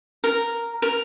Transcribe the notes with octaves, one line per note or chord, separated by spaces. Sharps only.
A#4
A#4